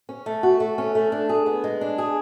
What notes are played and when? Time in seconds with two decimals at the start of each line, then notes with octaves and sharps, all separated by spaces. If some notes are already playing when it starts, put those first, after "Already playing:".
0.09 C#4
0.26 A3
0.43 F#4
0.60 A3
0.78 C#4
0.95 A3
1.12 D4
1.29 G#4
1.46 B3
1.64 G#3
1.81 D4
1.98 G#4